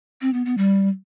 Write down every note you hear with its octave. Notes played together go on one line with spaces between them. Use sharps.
C4
B3
B3
G3